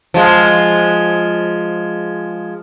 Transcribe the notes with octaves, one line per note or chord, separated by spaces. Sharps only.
F3 G#3